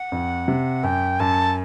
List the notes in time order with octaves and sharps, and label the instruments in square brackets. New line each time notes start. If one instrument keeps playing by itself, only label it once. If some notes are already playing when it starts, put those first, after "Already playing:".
Already playing: [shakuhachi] F#5
[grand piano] F2
C3
[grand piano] F#2 [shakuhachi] G5
[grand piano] F#2 [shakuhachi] A5